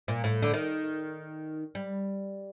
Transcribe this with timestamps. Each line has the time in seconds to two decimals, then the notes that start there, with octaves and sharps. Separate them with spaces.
0.08 A#2
0.24 A2
0.43 D3
0.54 D#3
1.75 G3